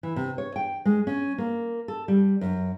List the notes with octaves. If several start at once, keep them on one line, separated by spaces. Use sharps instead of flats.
E3
C3
C#5
G5
G#3
C#4
A#3
A4
G3
F#2